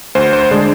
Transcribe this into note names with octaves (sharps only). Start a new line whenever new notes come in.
D2 C5
C5
D3 G#3 D4